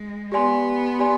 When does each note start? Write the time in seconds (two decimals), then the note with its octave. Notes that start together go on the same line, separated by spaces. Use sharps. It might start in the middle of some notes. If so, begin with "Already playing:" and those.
Already playing: G#3
0.32 B3 G4 D5 G#5 C6
0.99 G4 D5 G#5 C6